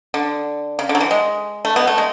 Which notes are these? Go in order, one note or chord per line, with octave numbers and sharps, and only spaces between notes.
D3
C#3
D3
F#3
E3
G#3
A3
B2 B3
A3
G#3